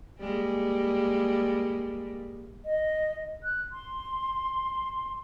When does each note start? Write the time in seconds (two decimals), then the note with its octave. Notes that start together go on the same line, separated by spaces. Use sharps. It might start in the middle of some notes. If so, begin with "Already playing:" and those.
0.19 G3 G#3 A#3
2.65 D#5
3.43 F#6
3.72 C6